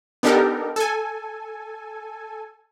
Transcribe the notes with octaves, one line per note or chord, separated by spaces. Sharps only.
B3 D4 D#4 G4 A4 A#4
A4 G#5